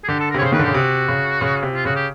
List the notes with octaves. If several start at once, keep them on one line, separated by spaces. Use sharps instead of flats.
G#4
D3 G4
A4
C3 A#4
C#5
C#3 C5
D#3 B4
D3
C#3 G4
C3 F#4
C#3
C#3
C3
F4
C#3 F#4
G4